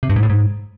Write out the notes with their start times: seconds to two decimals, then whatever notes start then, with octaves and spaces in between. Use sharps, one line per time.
0.03 C3
0.10 G2
0.16 G#2
0.23 A2
0.30 G#2